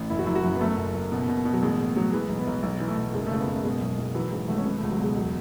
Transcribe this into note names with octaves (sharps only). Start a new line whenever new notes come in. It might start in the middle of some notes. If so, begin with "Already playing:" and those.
Already playing: A1
F#1 E4
F#4
F#2 E4
F#4
F#2 E4
B3
F#2 A3
F#1
F#1
B2
B2
B2
F#3
A1 G#3
A2 G#3
A2 F#3
E3 G#3
B1
B3
B1
B1
E3
A3
B1
F#1 G#3
C#3 A3
B3
F#1
A3
B2 G#3
B1
B1
E3 F#3
G#2 G#3
G#1 A3
C#4
B2 B3
A3
C#2
F#3
B2 G#3
E1 F#3